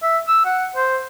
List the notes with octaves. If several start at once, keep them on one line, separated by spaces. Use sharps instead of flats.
E5
E6
F#5
C5